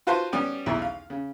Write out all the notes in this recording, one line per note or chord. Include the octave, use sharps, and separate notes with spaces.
F4 F#4 B4 C5 A5 C6
G3 B3 C#4 G5
B1 E2 E4
F5
C#3